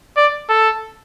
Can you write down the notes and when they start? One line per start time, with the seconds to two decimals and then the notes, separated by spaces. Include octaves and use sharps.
0.17 D5
0.50 A4